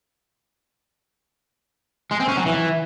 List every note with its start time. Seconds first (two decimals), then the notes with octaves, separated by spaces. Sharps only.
2.12 G#3
2.20 C4
2.29 C#4
2.37 F#3
2.46 E3